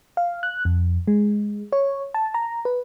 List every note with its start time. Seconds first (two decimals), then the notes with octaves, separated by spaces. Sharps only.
0.17 F5
0.43 F#6
0.65 F2
1.07 G#3
1.72 C#5
2.14 A5
2.34 A#5
2.65 B4